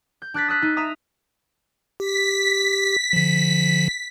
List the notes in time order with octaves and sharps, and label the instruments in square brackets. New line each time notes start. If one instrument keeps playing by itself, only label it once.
[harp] G6
D4 F#6 A6 B6
D#6 E6 F#6 B6
D#4
E5 A#5 D#6
[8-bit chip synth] G4 [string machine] B6
[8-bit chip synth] D3 F3